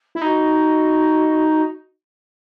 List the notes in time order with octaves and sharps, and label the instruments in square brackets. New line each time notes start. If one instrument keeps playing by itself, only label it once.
[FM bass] E4
[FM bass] D#4 [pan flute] F#4